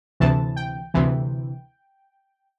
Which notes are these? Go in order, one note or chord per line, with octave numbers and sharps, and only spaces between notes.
D2 C3 E3 A5
G5
D2 C3 E3